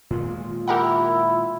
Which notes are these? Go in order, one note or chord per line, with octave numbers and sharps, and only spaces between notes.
A#2 D#3 G#3 F4
E4 G4 A#4 F#5